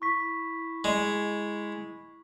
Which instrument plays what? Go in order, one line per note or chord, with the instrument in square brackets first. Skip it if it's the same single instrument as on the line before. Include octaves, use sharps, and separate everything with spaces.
[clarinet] E4 [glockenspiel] C#6 B6
[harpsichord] G#3